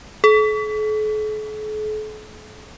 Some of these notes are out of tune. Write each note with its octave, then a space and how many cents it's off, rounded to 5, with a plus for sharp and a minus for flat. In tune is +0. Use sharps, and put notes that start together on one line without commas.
A4 -45